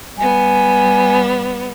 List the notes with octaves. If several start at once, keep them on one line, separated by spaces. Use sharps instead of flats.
G3 B3 G#5